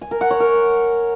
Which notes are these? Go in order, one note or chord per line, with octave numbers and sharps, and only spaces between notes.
G#5
A#4
F#5
C#5
A#4